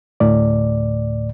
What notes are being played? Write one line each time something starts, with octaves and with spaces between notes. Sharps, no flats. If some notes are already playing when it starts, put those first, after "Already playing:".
D2 A2 D5